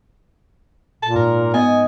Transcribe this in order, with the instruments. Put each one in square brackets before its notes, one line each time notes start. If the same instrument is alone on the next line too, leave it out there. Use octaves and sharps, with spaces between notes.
[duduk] A#2 [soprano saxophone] A5
[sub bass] G#2 [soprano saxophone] A#4
[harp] B3 D#5 [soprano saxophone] G#5